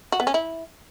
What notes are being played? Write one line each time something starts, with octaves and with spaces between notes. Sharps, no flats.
F#4
B3
C#4
E4